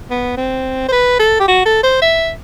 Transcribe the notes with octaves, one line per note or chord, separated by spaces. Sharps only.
B3
C4
C5
B4
A4
G4
F#4
A4
C5
E5